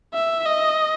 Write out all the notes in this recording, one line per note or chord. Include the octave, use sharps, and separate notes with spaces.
E5
D#5